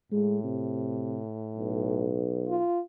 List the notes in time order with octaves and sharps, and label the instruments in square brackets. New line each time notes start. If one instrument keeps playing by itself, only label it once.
[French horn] A2 [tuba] G#3
[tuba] C3
B1
[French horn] F4